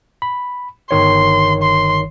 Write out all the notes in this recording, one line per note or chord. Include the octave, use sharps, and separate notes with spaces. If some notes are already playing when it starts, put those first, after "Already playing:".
B5
G1 D#3 C#5 C6
C6